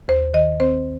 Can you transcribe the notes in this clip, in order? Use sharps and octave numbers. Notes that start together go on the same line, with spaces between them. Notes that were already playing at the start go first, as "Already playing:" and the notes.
D#2 C5
D#3 D#5
C4 C5